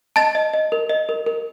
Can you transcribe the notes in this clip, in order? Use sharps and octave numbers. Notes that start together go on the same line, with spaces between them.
D#5 A5 A6
D#5
D#5
A#4
D#5
A#4
A#4